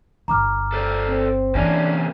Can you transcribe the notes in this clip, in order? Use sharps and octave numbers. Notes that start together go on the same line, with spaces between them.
G1 A#5 D6 F6
A4 C5 D5
C4
C3 E3 A#3 C#4 D4 G#5